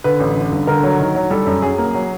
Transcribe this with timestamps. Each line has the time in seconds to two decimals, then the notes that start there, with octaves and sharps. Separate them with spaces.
0.04 D3 B4
0.20 A1
0.36 D3
0.52 G1
0.67 D3 A#4
0.83 F#3
0.99 D#3
1.15 F#3
1.30 G3 A4
1.46 F#2
1.62 F#3 G#4
1.78 A#3
1.94 F#3